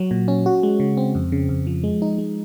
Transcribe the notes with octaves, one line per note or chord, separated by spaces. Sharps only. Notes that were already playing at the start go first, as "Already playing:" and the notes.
Already playing: F#3 F#4
A#2
C#4
F#4
G#3
C#3
C4
F2
C#3
F2
F3
G#3
D#4
G#3